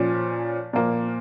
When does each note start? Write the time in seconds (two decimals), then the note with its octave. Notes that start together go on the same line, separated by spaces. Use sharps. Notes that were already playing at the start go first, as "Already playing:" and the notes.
Already playing: A#2 F3 C#4
0.73 A#2 F3 A#3